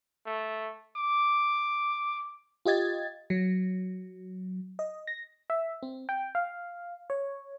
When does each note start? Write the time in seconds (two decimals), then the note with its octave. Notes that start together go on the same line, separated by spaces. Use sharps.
0.26 A3
0.97 D6
2.65 F4 G4 D#5 G#6 A6
3.30 F#3
4.79 D#5
5.07 A#6
5.50 E5
5.83 C4
6.09 G5
6.35 F5
7.10 C#5